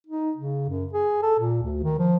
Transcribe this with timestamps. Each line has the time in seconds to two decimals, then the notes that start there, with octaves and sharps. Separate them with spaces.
0.07 D#4
0.37 C#3
0.69 F#2
0.93 G#4
1.22 A4
1.40 A#2
1.62 D2
1.83 D#3
1.98 F3